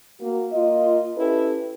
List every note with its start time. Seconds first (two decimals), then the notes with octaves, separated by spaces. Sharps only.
0.20 A#3 F#4
0.52 A#3 F4 D#5
1.17 C#4 E4 G4 A4 B4